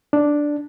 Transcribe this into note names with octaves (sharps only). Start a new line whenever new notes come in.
D4